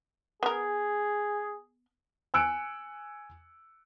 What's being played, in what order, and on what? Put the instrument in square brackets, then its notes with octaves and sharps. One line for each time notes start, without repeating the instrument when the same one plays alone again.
[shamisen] B3 A#4 [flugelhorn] G#4
[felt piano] G#5 E6 F#6 C#7 D7